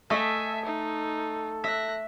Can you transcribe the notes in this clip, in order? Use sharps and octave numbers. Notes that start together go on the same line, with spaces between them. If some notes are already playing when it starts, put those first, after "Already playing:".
A3 A4 D#5 E5 G#5
D#4
E5 F#6 A#6